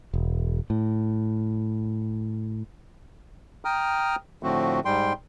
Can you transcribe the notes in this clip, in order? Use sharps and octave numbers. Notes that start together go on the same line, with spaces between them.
E1
A2
G5 A#5 D#6 F6
A2 D3 F3 A3 C4 F#4
G#2 G3 G5 C6